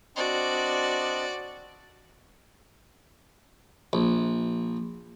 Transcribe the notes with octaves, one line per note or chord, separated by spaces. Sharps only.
C4 D4 F#4 D5 D#5
A#1